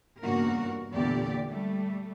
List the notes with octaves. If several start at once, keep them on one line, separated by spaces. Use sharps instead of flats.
E2 G2 C#3 A#3 F#4 A#4
E2 A#2 D3 A3 G4 D5
G3 A3